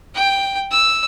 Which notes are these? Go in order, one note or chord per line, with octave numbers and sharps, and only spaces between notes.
G5
E6